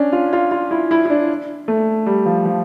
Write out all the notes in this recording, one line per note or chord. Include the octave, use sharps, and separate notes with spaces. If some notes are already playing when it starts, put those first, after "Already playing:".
Already playing: C#4 D4
F4
F4
F4
E4
E4
E4
D4
A3
G3
F3
F3